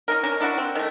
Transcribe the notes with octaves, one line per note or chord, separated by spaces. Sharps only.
C#4 D#4 A#4
C#4 D4 A#4
D4 E4 F#4
C4
D#3 A3